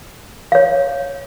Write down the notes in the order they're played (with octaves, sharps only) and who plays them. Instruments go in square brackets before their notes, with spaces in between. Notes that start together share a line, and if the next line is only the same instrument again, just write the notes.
[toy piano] C#5 F5